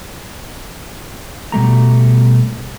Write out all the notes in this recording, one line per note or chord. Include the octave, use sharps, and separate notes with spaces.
B2 G3 A3 A#5